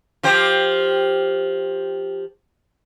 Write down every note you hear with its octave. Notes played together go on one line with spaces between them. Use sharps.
F3 G4 C5